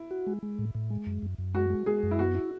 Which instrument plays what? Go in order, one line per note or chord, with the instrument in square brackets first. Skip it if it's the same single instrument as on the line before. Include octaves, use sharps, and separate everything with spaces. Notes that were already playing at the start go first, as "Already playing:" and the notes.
Already playing: [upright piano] E4
[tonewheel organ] F#4
G#3
G#3
A2
A2
G#3
F#2
F#2
F#2
[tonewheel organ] G#3 [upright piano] F#4
[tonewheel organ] G#3
[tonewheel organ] G#3 [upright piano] G#4
[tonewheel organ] F#2
[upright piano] E4
[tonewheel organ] B3 [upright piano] F#4
[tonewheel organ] E4